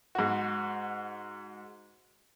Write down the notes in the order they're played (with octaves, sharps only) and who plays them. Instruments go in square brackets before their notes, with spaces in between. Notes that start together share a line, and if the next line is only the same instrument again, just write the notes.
[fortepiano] G#2 F#4